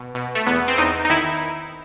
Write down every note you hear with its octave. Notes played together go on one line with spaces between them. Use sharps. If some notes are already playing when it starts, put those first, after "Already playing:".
Already playing: B2
B2
A3
E2 B3
C4
E2 D#4
D#4
D#3 E4